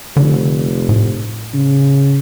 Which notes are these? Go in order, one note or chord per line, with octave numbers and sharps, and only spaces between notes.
F1 D3
A2
C#3